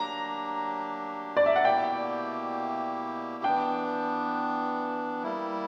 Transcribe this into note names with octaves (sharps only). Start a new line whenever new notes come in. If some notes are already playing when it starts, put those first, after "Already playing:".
Already playing: F#3 A#3 D4 G4 A#5
D5
E5
F#5
B2 A#3 E4 G4 G5
E3 B3 D4 G5
G3 A#3 E4